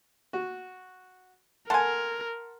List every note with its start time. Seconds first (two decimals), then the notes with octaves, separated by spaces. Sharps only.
0.33 F#4
1.70 A4 A#4 F#5 G#5 A5 C6